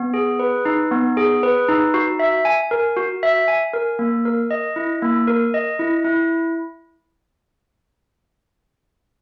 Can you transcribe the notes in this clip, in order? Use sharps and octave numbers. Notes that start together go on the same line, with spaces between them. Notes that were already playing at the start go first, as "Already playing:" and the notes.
Already playing: B3
G#4
B4
D#4
B3
G#4
B4
D#4
F#4
E5
G#5
A#4
F#4
E5
G#5
A#4
A#3
A#4
D#5
E4
A#3
A#4
D#5
E4
E4